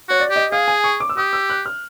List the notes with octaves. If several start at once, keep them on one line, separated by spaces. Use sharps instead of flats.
F#4 C#5
D5
G4
D#5
G#4 F5
G#5
C#6
D6
E6
G4 D#6
E6
F#6
F6